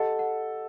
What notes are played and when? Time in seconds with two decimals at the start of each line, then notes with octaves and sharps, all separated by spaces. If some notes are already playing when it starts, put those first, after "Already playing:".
Already playing: G4 A4 D#5 F#5
0.19 F#5